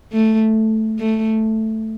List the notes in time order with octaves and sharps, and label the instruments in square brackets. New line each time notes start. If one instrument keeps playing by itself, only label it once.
[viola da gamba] A3
A3